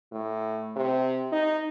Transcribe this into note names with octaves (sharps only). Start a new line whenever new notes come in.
A2
C3
D#4